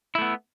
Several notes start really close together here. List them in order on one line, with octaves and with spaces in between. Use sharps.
E4 A3 B3